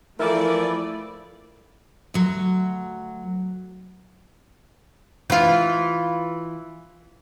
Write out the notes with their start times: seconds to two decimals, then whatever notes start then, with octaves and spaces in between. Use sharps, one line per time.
0.19 E3 F3 A3 E4 A#4 D5
2.14 D2 F#3
5.30 E3 F4